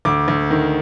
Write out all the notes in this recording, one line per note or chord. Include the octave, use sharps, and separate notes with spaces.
D2 D6
D2
D#3